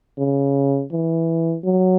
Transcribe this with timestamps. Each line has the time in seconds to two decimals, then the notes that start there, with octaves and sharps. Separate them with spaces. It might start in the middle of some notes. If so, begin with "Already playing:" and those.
0.19 C#3
0.92 E3
1.64 F#3